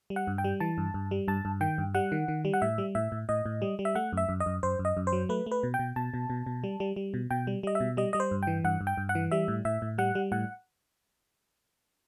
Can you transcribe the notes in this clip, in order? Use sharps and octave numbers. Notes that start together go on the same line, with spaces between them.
G3
F#5
G2
G5
G3
E3 A5
G2
G2
G3
G2 A5
G2
D#3 G5
G2
G3 F#5
D#3
D#3
G3
F#5
A2 E5
G3
A2 E5
A2
A2 D#5
A2
G3
G3
E5
A3 F#5
F#2 E5
F#2
D#5
F#2
F#2 C5
F#2
D#5
F#2
C5
F#3
A3 B4
A3
B4
B2
G5
B2
B2 A5
B2
B2
B2
G3
G3
G3
B2
B2 G5
G3
G3 D#5
E5
B2
G3 D#5
G3 D#5
C5
G2
E3 G5
G2 F#5
G2
G5
G2
F#5
E3
G3 E5
A2
A2 E5
A2
G3 F#5
G3
A2 F#5